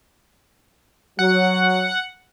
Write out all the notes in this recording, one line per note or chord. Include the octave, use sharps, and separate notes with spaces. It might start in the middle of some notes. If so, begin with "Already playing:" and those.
F#3 F#5